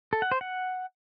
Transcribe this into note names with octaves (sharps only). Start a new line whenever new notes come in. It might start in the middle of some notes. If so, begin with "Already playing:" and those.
A4
F#5
C5
F#5